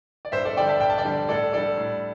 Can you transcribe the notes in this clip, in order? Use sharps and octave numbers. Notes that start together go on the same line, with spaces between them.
D5
G2 C5 E5
A4 D5
D3 G3 D5 G5
E5 A5
G2 G5
A5
D5 G5
D3 G3
A2 A4 D5
G3 D4 A4 D5
A2